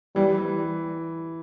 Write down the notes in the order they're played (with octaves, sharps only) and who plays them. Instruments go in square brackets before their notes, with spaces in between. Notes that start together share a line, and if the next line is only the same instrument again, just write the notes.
[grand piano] E3 [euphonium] G3
[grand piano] E3